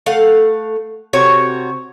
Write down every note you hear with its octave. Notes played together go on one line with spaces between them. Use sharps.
A3 F5 F#5
C3 F#4 C#5